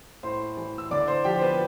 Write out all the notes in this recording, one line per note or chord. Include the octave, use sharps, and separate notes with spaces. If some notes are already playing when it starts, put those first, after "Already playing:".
A2 C5 C6
E3
E6
D3 D5 D6
C5 C6
F3 G4 G5
C5
B3 B4